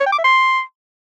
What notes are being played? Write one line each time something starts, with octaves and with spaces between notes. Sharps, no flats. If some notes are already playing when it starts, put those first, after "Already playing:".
C#5
G5
D6
E5
C6